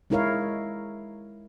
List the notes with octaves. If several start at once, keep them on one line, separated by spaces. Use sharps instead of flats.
G#3 D#4 E4 A#4 C#5 F5